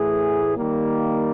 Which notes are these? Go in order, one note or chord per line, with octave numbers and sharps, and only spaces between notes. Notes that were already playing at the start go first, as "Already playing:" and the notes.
Already playing: A2 E3 A3 G#4
D#3 G3 A#3